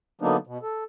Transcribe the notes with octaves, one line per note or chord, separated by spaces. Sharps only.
D3 F#3 A#3 B3 D4 D#4
B2
A4